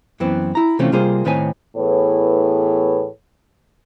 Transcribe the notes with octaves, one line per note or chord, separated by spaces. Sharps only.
F#2 E3 B3 C4
E4 A#5
C3 E3 A3 C4 C#4 F4
C3 G3 A#3 F4 G#4 C5
A2 D#3 C4 B4 C#5 G#5
A2 E3 B3 G#4 B4 C#5